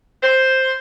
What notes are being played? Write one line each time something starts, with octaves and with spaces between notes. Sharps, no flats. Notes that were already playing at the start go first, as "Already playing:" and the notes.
C5